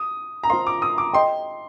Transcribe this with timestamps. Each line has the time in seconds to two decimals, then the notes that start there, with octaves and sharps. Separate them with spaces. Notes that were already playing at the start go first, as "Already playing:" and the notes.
Already playing: D#6
0.43 A#5
0.50 F4 C5 F5 C6
0.67 D6
0.82 D#6
0.98 D6
1.14 D#5 G5 C6